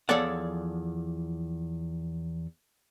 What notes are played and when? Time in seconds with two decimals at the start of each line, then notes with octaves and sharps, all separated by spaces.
0.09 E2 F3 A4 C#5 D5 F#5